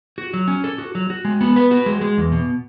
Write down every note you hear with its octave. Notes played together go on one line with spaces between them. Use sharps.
F#4
F#3
C#4
A4
F#4
F#3
F#4
G#3
B3
B4
F#4
G#3
G#3
E2
B2